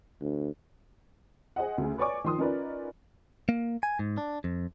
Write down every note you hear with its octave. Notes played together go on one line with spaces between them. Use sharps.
D2
G#4 C5 D#5 F#5
D2 C#3 G#4
B4 C#5 D5 G#5 C#6 D6
D#3 F3 C6 D#6
C#4 D#4 F4 A#4 B4 D5
A#3
G#5
G#2
D4
F2